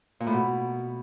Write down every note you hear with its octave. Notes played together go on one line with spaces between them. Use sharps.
A#2
A2
B2